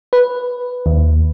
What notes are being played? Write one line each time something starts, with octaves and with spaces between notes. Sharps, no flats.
B4
D#2